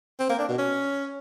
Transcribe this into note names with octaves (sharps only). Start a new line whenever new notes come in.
C4
A#3
D4
B2
C#4